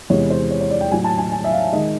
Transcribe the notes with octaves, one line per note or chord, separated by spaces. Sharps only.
E2 C3 E3 G#3 C#5
C5
C#5
C#5
D5
G5
A2 F#3 G#5
A5
G#5
G#5
E5
F5
D#3 G#3 D#5